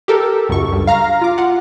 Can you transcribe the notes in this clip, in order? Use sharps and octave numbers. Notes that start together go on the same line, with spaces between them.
G4 A4 A#4
C#2 F#2 C#6
G2
F5 A#5 F6 A#6
F4 D6
F4 F#5